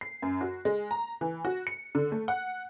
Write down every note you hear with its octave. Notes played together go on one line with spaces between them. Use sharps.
C7
F#2
F#4
G#3
A#5
E3
F#4
C#7
D3
A3
F#5